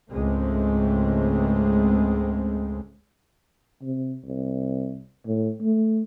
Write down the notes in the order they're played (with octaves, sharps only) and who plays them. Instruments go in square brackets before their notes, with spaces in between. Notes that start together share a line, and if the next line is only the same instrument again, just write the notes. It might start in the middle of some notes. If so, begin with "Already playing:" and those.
[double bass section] C#2 G#2 G#3 A3 C4
[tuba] C3
C2
A2
A3